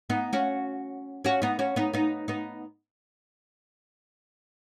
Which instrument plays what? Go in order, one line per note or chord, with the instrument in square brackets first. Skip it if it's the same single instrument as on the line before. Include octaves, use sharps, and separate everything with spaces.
[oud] B3 D#4
C#4 F#4
C#4 F#4
B3 D#4
C#4 F#4
B3 D#4
B3 D#4
B3 D#4